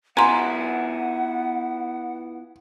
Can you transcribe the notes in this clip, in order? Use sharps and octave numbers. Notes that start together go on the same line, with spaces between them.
B3 E4 F4 F#5 G#5 A#5 C6